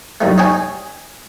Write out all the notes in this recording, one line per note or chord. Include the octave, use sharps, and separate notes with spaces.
C2 F#2 D#3 A3
D#4 C#5 D#5 G5 G#5